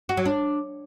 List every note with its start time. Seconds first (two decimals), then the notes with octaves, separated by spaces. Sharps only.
0.09 F#4
0.17 F#3
0.25 D4